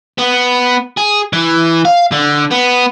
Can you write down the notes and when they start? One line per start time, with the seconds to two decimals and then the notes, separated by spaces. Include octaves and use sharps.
0.18 B3
0.98 G#4
1.33 E3
1.85 F5
2.12 D3
2.51 B3